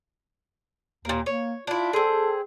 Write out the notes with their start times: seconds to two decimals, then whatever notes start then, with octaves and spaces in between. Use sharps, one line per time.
1.05 D#2 A#2 A#3
1.26 A#3 C#5
1.67 D4 E4 F4
1.93 C4 G#4 A4